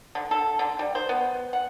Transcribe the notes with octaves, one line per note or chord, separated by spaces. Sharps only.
D3
A4
D3
G3
C5
B3
F#5